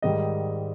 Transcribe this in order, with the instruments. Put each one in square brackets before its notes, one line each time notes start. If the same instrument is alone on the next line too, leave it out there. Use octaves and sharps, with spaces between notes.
[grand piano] G#2 D#3 G3 D#5